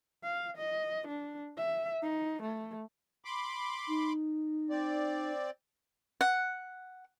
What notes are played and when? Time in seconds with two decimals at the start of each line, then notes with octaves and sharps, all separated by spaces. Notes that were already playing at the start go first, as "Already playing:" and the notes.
0.23 F5
0.57 D#5
1.08 D4
1.57 E5
2.02 D#4
2.42 A3
3.25 B5 C6 D6
3.87 D#4
4.70 C4 D5
6.21 F#5